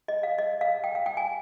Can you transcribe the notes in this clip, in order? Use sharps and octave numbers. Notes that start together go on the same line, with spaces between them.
D#5
F5
D#5
F5
G5
F5
G5
G#5